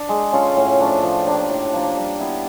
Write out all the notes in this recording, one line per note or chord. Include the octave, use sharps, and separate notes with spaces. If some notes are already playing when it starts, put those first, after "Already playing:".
Already playing: D4
G#3
C#4 F4 A4
A2
F3 A3 D4
F3
A#3 D4 G4
A2
F3 A#3 D4
G3
B3 E4 G4